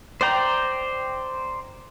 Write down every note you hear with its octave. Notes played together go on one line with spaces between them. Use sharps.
C5 D5 G5 A#5